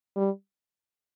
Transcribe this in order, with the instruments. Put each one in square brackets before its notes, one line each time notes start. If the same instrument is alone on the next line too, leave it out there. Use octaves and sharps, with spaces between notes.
[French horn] G3